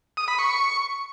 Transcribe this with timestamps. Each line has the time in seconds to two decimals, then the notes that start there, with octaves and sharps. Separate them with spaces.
0.17 D#6
0.28 B5
0.39 C#6